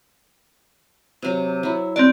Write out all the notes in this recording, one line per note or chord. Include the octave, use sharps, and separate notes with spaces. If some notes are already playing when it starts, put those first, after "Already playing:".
C3 F#3
F#3 E4
C4 C#4 F#4 D5